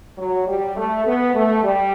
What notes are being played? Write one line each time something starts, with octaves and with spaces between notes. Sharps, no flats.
F#3
G3
A3
B3
A3
G3